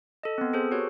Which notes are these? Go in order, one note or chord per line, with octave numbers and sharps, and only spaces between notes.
A4 D#5
B3 C4
G#4 A4 C5
F#4 G4 B4 C#5